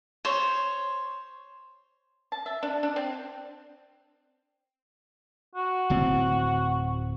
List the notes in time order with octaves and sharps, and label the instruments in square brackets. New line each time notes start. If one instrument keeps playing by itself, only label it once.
[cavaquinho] C5 C#5
[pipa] A5
E5
D4
D4
C4
[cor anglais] F#4
[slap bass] D1 A2 C4